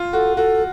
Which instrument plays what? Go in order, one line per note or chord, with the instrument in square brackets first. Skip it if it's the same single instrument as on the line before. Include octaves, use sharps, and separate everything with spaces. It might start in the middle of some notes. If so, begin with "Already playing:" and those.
Already playing: [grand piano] F4
[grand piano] F#4 [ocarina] A4
[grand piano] F#4 [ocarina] A4